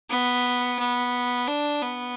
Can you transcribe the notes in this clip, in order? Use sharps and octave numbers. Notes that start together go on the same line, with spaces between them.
B3
B3
D4
B3